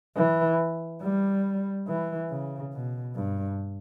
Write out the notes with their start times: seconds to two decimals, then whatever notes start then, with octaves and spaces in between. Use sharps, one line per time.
0.17 E3
1.02 G3
1.88 E3
2.30 C#3
2.73 B2
3.15 G2